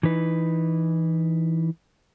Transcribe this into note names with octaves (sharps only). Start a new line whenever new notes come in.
E3 D#4 B4